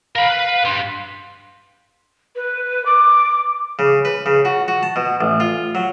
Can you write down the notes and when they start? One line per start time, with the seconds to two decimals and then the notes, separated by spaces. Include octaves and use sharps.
0.16 A#4 F5 B5
0.29 B4
0.65 G2 G3 C6
2.35 B4
2.85 D6
3.79 C#3
4.05 B4
4.26 C#3
4.45 F#4
4.68 F#4
4.83 A5
4.96 B2
5.21 A1
5.40 F4
5.75 F#3